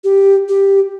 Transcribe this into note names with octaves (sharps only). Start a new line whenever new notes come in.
G4
G4